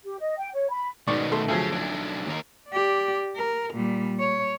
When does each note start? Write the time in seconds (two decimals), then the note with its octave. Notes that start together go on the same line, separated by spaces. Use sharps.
0.04 G4
0.20 D#5
0.38 G5
0.54 C#5
0.70 B5
1.07 G#2 B2 D#3 D5 C#6
1.32 A3 C6
1.48 D2 F3 F#3 G#4 F5
1.72 B1 D4
2.26 D#2 A#4
2.69 G4 D5
3.36 A#4
3.73 A#2 G3
4.20 C#5